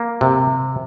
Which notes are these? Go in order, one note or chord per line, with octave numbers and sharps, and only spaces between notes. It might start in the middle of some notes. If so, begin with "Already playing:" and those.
Already playing: A#3
C3